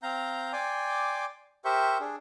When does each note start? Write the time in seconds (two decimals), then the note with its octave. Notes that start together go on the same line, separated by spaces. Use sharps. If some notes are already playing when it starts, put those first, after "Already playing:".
0.03 C4 F5 A#5 G6
0.53 D5 G5 G#5 C6 D6
1.65 G4 A#4 C5 E5 C#6 G6
2.00 D4 G#4